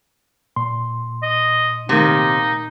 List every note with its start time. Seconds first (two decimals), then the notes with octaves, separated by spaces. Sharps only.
0.56 A#2 C6
1.23 D#5
1.89 C3 D#3 A#3 D#4 G4